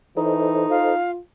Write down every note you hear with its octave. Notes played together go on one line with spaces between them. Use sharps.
E3 D#4 A4 C5 D#5
F4 F5